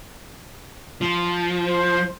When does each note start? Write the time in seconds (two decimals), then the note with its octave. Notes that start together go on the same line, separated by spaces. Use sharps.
1.01 F3
1.65 C5